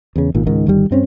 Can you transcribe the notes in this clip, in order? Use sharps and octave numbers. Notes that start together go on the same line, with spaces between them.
E2 C#3
G#1 A#2 D#3
C#2 G#2 D#3
G1 D#3 G3
G2 C4 C#4